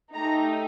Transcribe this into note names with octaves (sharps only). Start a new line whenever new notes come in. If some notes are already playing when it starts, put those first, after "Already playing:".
A3 D#4 G4 A#5